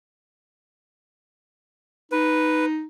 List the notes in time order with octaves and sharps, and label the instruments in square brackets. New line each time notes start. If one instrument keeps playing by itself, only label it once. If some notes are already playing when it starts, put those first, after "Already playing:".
[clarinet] D#4 [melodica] B4